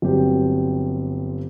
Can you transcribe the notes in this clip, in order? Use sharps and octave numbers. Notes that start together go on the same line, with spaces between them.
G1 F#3 C4 G4